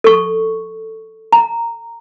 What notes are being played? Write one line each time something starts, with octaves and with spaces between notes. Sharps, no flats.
A4 C#6
A#5